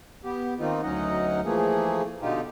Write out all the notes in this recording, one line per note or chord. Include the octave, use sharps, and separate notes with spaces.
B3 G4
D#3 A#3 C4 D#4 F4
D2 F#3 C#4 D#4 D#5 F#5
E3 F3 A3 A#3 G#4
B2 D3 D#4 F4 G4